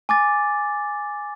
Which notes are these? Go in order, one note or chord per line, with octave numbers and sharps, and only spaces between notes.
G#5 D6 A6